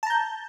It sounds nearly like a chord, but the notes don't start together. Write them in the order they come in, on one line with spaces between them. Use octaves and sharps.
A5 A#5 G6